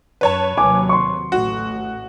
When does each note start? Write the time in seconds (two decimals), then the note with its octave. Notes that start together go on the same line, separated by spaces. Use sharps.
0.21 F#2 B4 C#5 A5
0.58 D#2 C3 F#3 G#5 D6
0.89 C6 C#6
1.32 A1 A2 F#4